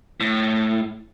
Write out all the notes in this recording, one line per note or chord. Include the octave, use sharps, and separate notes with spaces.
A2